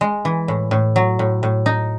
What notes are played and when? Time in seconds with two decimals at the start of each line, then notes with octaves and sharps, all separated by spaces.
0.01 G#3
0.25 E3
0.48 A2
0.71 A2
0.96 F#3
1.19 A2
1.43 A2
1.66 D#4